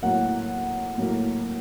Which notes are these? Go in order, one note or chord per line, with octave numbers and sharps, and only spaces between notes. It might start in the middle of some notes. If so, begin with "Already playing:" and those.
A2 F#3 A#3 F#5
A2 F#3 A#3